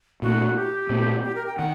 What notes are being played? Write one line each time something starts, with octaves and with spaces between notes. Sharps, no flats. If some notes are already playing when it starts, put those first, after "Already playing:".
A#2 A3 D4 F#4
F#4
G4
A#2 A3 C4
G4
A#4
G5
D#3 F#5